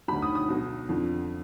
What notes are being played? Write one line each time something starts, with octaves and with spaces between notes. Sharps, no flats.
D2 D3 F#3 B5
D#6
D#6
B1 B2 F#3
F2 D3 F3